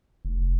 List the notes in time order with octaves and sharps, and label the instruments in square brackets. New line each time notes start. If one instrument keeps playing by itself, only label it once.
[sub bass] F1